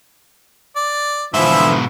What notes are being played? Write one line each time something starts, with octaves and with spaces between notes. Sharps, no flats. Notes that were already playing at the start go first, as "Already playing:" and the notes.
D5
G#2 B2 D3 E3 F3 E4 E5